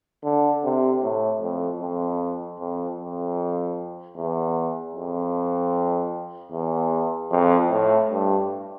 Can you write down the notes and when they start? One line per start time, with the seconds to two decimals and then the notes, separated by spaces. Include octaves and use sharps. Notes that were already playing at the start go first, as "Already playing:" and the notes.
0.24 D3
0.64 C3
1.03 A2
1.42 F2
1.82 F2
2.60 F2
2.99 F2
4.16 E2
4.95 F2
6.52 E2
7.31 F2
7.70 A2
8.09 G2